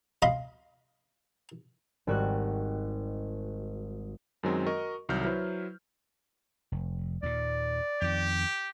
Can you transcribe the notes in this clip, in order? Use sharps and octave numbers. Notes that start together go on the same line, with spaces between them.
D#5 F5 B5 C6
G#1 G3 F#4 D#5 F#6
F#2 D#3 F#3 G#3 C4
F#4 A#4 D#5 C#6
C2 D#3 F#3 F6 G6
F#3 E4 B4 C5
F1
D#2 A#2 D5
F2 D#3 G4